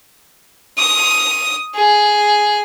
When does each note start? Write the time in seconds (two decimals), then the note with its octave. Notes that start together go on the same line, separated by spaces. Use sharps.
0.78 D#6
1.75 G#4